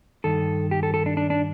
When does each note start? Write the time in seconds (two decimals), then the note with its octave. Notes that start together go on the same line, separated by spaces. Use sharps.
0.24 G2 D#3 A4
0.71 G4
0.83 A4
0.94 A4
1.06 D4
1.17 D4
1.30 D4